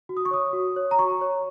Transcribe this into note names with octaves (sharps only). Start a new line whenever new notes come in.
F#4
D#6
C#6
C#5 D#6
F#4
C#5
A#5
F#4 C#6
C#5